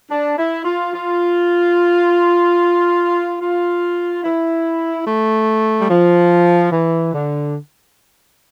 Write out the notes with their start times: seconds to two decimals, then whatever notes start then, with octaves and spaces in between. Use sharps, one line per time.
0.10 D4
0.38 E4
0.65 F4
0.93 F4
3.41 F4
4.24 E4
5.06 A3
5.80 G3
5.89 F3
6.72 E3
7.13 D3